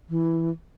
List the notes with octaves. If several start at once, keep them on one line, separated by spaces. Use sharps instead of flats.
E3